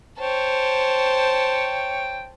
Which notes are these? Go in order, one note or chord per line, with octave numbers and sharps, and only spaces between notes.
C5 C#5 G5 A5